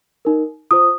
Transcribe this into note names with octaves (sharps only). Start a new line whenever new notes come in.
D#4 A#4
F4 C5 D#6